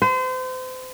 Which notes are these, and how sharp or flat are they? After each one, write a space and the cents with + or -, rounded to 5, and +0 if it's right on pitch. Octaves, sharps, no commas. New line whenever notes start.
C5 -35